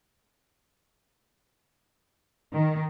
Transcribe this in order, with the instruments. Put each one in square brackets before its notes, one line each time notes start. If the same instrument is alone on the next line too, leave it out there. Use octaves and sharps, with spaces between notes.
[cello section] D#3